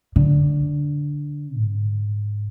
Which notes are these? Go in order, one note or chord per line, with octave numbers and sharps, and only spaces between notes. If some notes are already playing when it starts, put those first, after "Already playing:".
D3
G#2